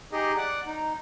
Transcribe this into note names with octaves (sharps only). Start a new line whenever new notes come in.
D#4 G4 G#4 D#5
D5 F#5
D#4